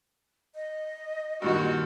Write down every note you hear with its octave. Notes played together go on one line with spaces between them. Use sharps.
D#5
G2 A#2 D#3 F#4